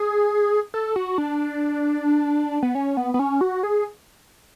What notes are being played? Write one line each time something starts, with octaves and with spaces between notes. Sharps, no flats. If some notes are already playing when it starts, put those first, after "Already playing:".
Already playing: G#4
A4
F#4
D4
B3
C#4
B3
B3
C#4
F#4
G#4